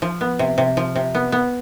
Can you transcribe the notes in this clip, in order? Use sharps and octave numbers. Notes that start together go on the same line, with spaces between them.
F3
B3
C3
C3
F3
C3
B3
B3